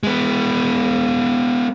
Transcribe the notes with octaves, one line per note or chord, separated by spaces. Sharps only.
G#3 B3